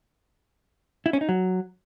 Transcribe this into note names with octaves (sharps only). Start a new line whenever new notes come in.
E4
C#4
D#4
F#3